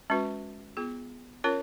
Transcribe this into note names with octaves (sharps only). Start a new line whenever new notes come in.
G#3 C#4 F#4 B4
B3 F4 G#4
C#4 F4 A#4 C#5